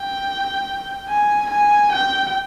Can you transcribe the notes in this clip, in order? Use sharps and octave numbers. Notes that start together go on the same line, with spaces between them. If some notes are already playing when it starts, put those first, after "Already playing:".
Already playing: G5
G#5
G#5
G5